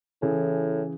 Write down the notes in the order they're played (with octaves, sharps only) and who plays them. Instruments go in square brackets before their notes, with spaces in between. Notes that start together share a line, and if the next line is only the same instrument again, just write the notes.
[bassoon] A2 [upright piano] C#3 E3 G#4